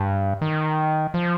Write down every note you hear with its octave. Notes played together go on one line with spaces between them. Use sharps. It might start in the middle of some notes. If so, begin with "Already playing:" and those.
Already playing: G2
D#3
F3